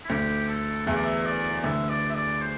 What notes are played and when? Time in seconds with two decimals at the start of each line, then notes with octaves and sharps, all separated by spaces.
0.05 E4
0.10 D2 D3 G4
0.48 A4
0.86 E2 E3 E5
0.96 D5
1.04 E5
1.26 D5
1.59 D5
1.64 D2 D3 E5
1.89 D5
2.10 E5
2.15 D5
2.41 C5